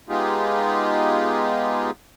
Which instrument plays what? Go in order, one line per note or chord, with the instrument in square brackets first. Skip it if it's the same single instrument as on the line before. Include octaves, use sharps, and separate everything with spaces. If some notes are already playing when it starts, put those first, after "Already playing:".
[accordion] G#3 B3 D#4 F4 G4 G#4